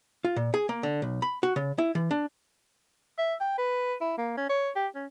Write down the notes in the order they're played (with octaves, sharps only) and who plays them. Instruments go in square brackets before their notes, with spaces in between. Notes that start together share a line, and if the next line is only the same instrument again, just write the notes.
[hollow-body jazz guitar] F4
A#2
G#4
A#3
D3
B1
B5
F#4
C#3
E4
E3
D4
[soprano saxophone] E5
G5
B4
E4
A#3
C#4
C#5
G4
C#4